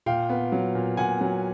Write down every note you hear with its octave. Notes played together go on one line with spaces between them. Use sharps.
A#2 F5 G5
B3
F#3
A#2
A#2 F#5 G#5
F#3